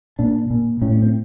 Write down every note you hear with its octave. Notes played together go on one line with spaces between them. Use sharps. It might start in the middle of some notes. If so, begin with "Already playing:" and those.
A#2 D4
A#2
A2 C#4
C#4
C4